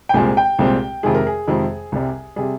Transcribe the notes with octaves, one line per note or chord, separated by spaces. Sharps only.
G5
C2 A#2 G#3 C4 G#5
G5
C2 A#2 G#3 C4
F2 C3 D#3 G#3 G#4
A#4
G#4
F2 C3 D#3 G#3
C2 C3 G3
C3 G3 G#4